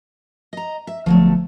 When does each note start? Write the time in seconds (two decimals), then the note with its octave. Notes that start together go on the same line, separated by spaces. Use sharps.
0.53 D#5 A#5
0.87 E5
1.06 G1 F3 F#3 A3